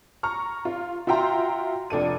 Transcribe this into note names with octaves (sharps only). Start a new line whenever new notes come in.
A#5 C#6 F6
F4
F4 F#4 E5 G5 A#5 C6
F1 D4 A4 D#7